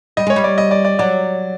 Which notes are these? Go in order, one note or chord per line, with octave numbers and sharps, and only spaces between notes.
G3 D#5
G#3 C#5
G3
D5
D#5
D5
D5
F#3 D5